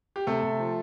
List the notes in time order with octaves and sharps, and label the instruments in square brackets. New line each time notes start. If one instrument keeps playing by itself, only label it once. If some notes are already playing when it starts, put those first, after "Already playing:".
[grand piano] G4
C3 A3 A4
C3
F3